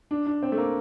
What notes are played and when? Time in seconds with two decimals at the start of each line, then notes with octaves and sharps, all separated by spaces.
0.11 D4
0.26 D4
0.43 C4
0.52 A3
0.58 A#3